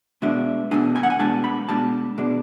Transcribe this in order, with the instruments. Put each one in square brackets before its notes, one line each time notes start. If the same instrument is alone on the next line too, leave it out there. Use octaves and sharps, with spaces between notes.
[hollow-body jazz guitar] B2 G#3 D4 E5
B2 G#3 D4 G#5
G#5
F#5
G#5
B2 G#3 D4 A5
B5
B2 G#3 D4 A5
B2 G#3 D4